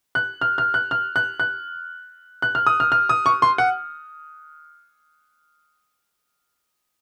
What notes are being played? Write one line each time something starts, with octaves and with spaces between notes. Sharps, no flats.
F#6
F6
F6
F#6
F6
F#6
F#6
F#6
F6
D#6
F6
F6
D#6
C#6
C6
F#5